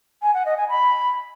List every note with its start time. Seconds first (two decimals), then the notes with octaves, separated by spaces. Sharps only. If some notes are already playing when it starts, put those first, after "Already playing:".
0.22 G#5
0.34 F#5
0.46 D#5
0.57 G#5
0.69 B5